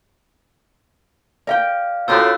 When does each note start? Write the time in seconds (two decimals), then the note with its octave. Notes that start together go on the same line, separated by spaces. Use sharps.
1.47 A#4 D5 F5 G5
2.08 F#2 A2 D#4 F4 C5 E6 F#6